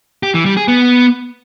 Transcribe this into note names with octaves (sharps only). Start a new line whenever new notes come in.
G4
E3
G3
G#4
B3